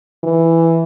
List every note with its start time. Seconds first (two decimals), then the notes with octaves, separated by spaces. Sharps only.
0.24 E3